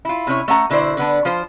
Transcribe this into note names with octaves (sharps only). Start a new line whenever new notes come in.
E4 F4
C3 C#4 E4 C#5
A3 C#4 F#5 A#5
B2 D3 E4 F#4 C5 D5
D3 B3 D4
F3 F4 C5